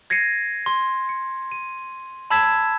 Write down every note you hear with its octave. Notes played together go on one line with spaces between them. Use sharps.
G#6 A#6 C7 C#7 D#7
C6
C#7
D#7
A5 B5 E6 G#6 B6 E7